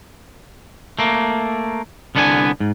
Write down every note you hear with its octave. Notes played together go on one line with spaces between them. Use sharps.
A3 A#3
C2 D3 B3 D4 F#5 G#5
G#2